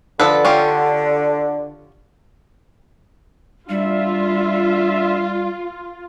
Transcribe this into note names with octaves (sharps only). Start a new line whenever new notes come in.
D3 F3 A4 B4
C#4 F4 G4
A1 G3 D4 F4 E5